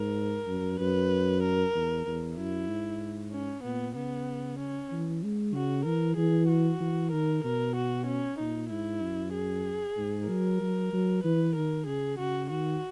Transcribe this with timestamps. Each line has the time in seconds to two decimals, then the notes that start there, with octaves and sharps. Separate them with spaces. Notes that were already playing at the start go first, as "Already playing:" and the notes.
Already playing: G#2 A#4
0.47 F#2
0.79 F#2 B4
1.43 A#4
1.75 E2
2.06 E2
2.37 F#2 E4
2.68 G#2
3.32 C#4
3.63 A#2 B3
3.95 C#3 B3
4.59 C#4
4.91 E3
5.23 G#3
5.54 C#3 F#4
5.85 E3 A#4
6.17 E3 G#4
6.49 F#4
6.80 E3
7.12 D#3 A#4
7.44 B2 A#4
7.76 F#4
8.07 C#4
8.39 A#2 D#4
8.70 G#2 E4
9.02 F#2
9.34 G#4
9.97 G#2
10.28 F#3 A#4
10.61 F#3
10.93 F#3
11.24 E3 B4
11.55 D#3 A#4
11.86 C#3 G#4
12.18 C#3 F#4
12.50 D#3 F#4